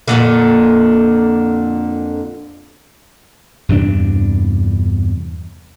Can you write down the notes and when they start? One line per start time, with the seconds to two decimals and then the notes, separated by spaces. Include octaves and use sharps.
0.08 F2 A#2 D3
3.69 E2 G2 C3 D4